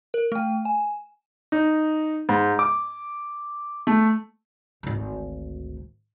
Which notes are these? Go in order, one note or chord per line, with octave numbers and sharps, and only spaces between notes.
A#4
A3 G5
G#5
D#4
G#2
D6
A3
G#1 D2